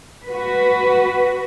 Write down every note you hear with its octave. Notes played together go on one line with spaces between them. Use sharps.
F#4 B4